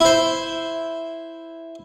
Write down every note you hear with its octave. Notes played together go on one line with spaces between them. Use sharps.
E4 C5